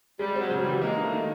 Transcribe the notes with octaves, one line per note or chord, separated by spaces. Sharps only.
G3 G#3
F#3 C4
C#3
G3
E3
G#3 A#3
A3 D#4
D#3